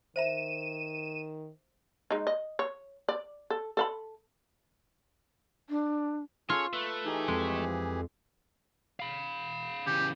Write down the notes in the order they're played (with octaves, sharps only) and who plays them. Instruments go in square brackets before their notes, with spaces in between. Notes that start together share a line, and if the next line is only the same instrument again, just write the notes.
[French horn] D#3 [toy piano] C5 E5 A#5 [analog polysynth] D#7 E7
[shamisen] G#3 D#4
D#5
C#5
D5
A4
A4 F5 B5
[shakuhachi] D4
[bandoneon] C#4 G#4 A4 [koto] F4 [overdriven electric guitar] C#5
[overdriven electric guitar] A3 [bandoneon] B4
[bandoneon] E3 G4 G#4 [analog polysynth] D#4
[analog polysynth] F2 [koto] G#3
[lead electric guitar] F5 B5
[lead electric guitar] C#3 E3 [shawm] G4